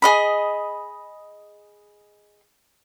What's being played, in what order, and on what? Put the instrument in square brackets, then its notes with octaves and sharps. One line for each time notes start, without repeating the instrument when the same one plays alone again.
[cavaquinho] G#4 D#5 B5